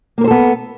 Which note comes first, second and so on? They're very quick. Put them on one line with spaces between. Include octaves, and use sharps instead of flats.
A#3 A#4 C5 A4 B3